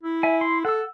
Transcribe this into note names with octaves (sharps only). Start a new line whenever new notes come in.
E4
E5 G#5
C6
A4 F#5 E6